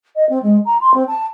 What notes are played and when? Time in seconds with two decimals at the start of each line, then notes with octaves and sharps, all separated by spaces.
0.15 D#5
0.29 C4
0.42 G#3
0.65 A#5
0.81 C6
0.93 C4
1.07 A5